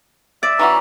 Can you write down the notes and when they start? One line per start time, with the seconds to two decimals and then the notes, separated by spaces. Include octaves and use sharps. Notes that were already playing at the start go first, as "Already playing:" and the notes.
0.43 D5 E5
0.59 E3 C#4 F#4 A#5